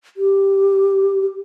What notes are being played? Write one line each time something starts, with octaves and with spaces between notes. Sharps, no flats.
G4